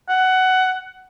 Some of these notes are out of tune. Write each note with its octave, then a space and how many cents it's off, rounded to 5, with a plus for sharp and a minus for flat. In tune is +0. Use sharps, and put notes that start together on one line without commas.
F#5 +15